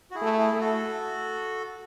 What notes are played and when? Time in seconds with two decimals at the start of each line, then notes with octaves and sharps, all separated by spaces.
0.11 F#4
0.15 E4 G#4
0.22 A3
0.37 E4 G#4
0.54 A3
0.60 F#4 A4